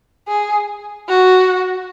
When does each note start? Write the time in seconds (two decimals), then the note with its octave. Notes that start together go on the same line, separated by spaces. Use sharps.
0.28 G#4
1.09 F#4